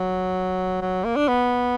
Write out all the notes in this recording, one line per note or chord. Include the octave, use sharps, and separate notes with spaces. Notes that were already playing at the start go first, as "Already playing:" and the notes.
Already playing: F#3
F#3
A#3
D4
B3